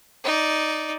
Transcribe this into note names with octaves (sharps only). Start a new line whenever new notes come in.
D#4 D5